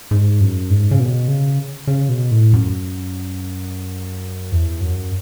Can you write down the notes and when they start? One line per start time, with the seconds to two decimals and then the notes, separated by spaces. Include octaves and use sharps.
0.11 G#2
0.41 F#2
0.70 G#2
0.91 C#3
0.99 B2
1.28 C#3
1.87 C#3
2.09 B2
2.31 A2
2.53 F#2
4.52 E2
4.81 F#2